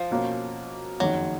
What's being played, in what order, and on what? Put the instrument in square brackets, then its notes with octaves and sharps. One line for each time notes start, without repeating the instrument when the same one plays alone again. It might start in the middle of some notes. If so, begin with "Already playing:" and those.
Already playing: [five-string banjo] F3
[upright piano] B2 A#3 C#4
[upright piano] F#1 F2 D#3 [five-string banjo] F#3